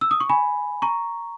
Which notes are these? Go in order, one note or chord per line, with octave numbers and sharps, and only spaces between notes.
E6
D#6
C#6
G#5 B5
A#5 C#6